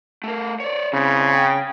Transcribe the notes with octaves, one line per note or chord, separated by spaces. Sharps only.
A3 A#4
C#5 D5
C#3 C4 E4
G5